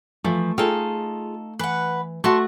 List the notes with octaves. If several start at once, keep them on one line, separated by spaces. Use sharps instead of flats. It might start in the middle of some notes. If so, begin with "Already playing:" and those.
E3 F3 A3
D#4 F4 G#4 A4 F5 G5
E3 B4 F#5
A3 F#4 A5 C6 C#6